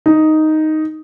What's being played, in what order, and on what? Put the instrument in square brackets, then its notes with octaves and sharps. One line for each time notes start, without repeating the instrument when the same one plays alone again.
[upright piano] D#4